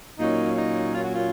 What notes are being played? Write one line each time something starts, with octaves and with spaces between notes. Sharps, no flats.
A#2 F#3 A#3 C#4 D#4
D#4
F4
F#4
F4